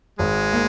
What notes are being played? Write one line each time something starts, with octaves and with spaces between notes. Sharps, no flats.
G#1 G#3
A#3